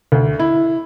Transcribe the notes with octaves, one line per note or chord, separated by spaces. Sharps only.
D2
E4